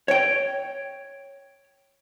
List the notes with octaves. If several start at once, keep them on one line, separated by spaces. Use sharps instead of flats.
C#5 G5